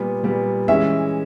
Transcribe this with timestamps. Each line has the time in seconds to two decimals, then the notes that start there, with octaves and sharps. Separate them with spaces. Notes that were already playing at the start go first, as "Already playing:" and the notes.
Already playing: A#2 G3 B3
0.23 A#2 G3 B3
0.68 E3 G#3 C#4 E5